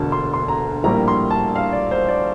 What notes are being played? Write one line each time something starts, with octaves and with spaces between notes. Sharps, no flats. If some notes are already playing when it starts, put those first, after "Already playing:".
Already playing: E1 D2 D3 A5
C6
C6
A#5
A#1 A2 G3 A#3 A#5
C6
A5
F5
D5
C5
D5